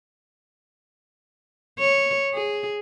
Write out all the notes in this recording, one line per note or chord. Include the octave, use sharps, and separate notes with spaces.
C#5
G#4